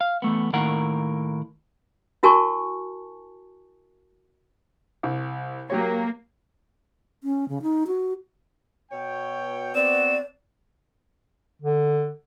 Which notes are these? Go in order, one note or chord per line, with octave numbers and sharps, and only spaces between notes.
F5
E2 A3 B3
A2 D#3 A#3 A#4 F#5
E4 F#4 A#4 G#5 A5 C#6
C2
F#3 A#3 G4 C#5
C#4
C#3
D#4
F#4
B2 C#5 G5
B3 C4 F#4 D5 E7
D3